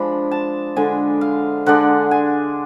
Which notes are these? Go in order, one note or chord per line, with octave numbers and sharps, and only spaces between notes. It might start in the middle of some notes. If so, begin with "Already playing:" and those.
Already playing: F3 G#3 D4 B5
A5
D3 G#3 D4 G#5
F5
D3 G#3 D4 F#5
G#5